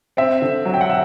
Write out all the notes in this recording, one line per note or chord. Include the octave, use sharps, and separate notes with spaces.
C4 E5
D3
F#3
G5
F#5
E5